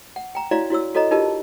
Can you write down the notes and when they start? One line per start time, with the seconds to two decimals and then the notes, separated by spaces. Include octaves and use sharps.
0.16 F#5
0.35 G5 A#5
0.51 E4 F#4 C#5 D5 F5 A#5
0.70 E4 F#4 C#5 E6
0.95 F#4 A4 C#5 D#5 A#5
1.11 D#4 F4 G4 A#4 D#5 A5